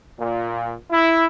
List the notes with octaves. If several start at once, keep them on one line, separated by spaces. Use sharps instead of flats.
A#2
E4